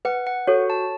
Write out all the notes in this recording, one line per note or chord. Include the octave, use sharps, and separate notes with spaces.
B4 F#5
F#5
F#4 A4 C#5
A5